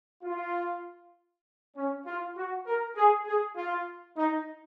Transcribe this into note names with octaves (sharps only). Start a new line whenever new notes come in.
F4
C#4
F4
F#4
A#4
G#4
G#4
F4
D#4